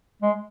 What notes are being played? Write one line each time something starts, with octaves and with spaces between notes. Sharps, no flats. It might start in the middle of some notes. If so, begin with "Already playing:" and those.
G#3